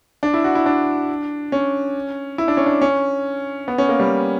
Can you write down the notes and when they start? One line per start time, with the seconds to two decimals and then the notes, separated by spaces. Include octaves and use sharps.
0.23 D4
0.34 E4
0.44 F#4
0.55 E4
0.66 D4
1.52 C#4
2.38 E4
2.48 D4
2.57 C#4
2.66 D4
2.81 C#4
3.68 B3
3.78 C#4
3.89 A#3
4.00 G3